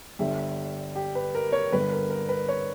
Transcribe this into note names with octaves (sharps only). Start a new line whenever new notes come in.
G1 G2 D3 G3 E5
G4
B4
A#4
C#5
G1 G2 D3 B4
A#4
A#4
B4
C#5